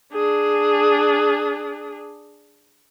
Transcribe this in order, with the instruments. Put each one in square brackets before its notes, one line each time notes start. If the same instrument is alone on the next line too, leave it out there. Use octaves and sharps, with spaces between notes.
[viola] D4 G#4